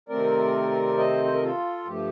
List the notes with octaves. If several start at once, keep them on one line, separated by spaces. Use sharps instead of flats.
C3 D#3 A3 C4 A#4 D5
C5 D#5
C5
A#4
F4 A4
G2 F3 A3 G4